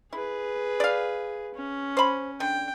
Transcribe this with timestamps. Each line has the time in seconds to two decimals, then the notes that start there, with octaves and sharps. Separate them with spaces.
0.13 E4 G#4 B4
0.80 D5 F5
1.54 C#4
1.97 C5 B5
2.40 D3 G5